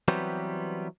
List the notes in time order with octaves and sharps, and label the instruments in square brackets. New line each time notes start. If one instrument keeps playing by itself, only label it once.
[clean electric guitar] E3 F#3 G3 B3 C4 G4